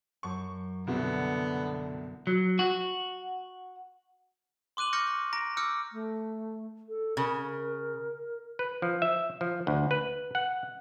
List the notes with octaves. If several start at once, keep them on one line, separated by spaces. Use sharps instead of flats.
F#2 A5 C#6
C2 B2 D3 B3
F#3
F#4
C6 D6 F#6 D#7 F#7
C#6 D6 F6 G6 A#6 C#7
A#5 A#6 D7
D6 E6 F6 G6 C#7
A3
A4
C#3 A#4
B4
F3
E5
F3
D2
B4
F#5